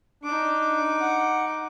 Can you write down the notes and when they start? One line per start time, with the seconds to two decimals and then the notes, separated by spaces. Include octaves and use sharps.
0.24 D4 D#4 D6
1.01 F#5